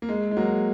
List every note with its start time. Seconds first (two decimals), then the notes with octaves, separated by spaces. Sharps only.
0.02 A#3
0.09 G#3
0.31 G#3
0.37 F#3 A#3